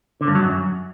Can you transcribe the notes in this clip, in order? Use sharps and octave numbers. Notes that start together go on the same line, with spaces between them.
D3
G2
F#3
F#2